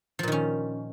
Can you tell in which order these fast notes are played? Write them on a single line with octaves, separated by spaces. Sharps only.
F3 A#2 D#3 C#4